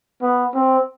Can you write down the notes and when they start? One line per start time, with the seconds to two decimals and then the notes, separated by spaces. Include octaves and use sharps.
0.22 B3
0.54 C4